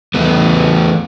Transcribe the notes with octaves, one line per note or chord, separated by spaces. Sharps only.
E2 E3 A3 B3